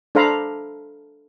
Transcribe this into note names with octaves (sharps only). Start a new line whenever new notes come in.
D4 A4 C5 F5 A#5 B5